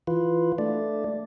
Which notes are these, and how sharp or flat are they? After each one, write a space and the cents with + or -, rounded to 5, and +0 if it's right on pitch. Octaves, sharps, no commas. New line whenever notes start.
E3 +0 F4 +0 B4 +0
A3 +0 D4 +0 D5 +0